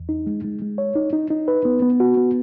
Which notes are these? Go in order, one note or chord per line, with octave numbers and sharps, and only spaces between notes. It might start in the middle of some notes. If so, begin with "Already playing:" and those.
Already playing: E2
D#4
G#3
G#3
G#3
C#5
D#4
D#4
D#4
B4
B3
B3
F#4
B3